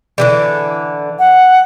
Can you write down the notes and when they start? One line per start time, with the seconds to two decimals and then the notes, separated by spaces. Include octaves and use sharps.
0.18 D3 E3 G3
1.19 F#5